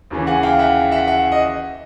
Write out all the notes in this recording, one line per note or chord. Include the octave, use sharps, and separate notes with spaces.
D#2 C#3 E3
F#5 G#5
F5 G5
E5 F#5
E5 F#5
E5 F#5
D#5